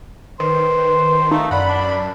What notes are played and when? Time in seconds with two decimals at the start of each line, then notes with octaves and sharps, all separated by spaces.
0.40 D#3 B4 C5
1.31 A3 D#4 F5
1.51 F#2 D5 F#5 B5
1.69 D4